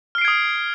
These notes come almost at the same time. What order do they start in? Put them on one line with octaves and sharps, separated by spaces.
F6 C7 D7 G#6 D#6